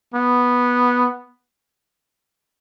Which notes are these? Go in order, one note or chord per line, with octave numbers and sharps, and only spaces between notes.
B3